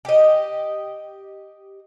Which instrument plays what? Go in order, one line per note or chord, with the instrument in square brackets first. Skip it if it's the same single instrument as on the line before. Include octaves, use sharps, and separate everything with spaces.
[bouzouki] G4 D#5